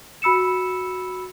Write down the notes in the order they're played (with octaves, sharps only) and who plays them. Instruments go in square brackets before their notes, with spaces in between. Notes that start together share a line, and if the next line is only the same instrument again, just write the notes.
[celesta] F#4 B5 E6 C#7 E7